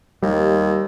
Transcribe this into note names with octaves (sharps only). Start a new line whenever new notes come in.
D#2 G3